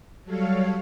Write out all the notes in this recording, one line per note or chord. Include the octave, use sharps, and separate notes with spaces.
F#3 G3 A4 C#5 F5